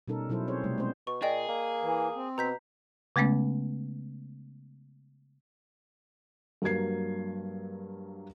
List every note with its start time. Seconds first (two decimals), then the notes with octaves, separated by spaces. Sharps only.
0.08 B2 G3 C#4 D#4 A4 A#4
0.29 B2 F#3 E4 A4 C5
0.48 C4 G#4 C5 C#5
0.64 C3 G3 A3
0.78 G#3 B3 C#4 C5
1.07 B2 C#6
1.22 A#2 G#4 D5 D#5 G5
1.49 A#3
1.82 E3
2.15 C4
2.38 B2 A#5 G6 B6
3.16 C#3 G#3 A3 B3 C#4
6.62 G2 F#3 A#3 A#4 G#6 C7